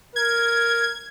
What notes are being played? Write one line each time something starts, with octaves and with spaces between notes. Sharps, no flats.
A#4 G#6